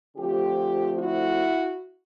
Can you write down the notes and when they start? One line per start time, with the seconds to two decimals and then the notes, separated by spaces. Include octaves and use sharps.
0.16 D3 F3 A3 C4 F4 G4
0.99 E4 F#4